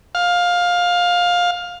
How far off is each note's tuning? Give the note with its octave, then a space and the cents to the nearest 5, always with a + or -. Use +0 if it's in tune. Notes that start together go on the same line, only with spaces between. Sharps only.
F5 +15